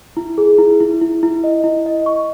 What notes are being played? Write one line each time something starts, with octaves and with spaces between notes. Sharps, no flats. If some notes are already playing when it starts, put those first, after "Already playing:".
E4
G#4
E4
E4
E4
E4
D#5
E4
D#5
C#6